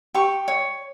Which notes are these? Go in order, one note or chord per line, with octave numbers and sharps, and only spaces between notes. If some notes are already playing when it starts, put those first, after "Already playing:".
G4 C#6
C#5